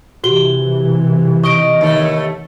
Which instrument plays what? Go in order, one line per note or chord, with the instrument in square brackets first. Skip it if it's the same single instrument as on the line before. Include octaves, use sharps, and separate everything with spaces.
[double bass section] C3 E3 [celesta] F#4 G4 G7
[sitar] D#5 [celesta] C#6 D7
[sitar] D#2 A3